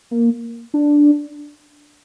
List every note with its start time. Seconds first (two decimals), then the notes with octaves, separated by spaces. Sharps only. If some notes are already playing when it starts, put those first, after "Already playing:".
0.11 A#3
0.74 D4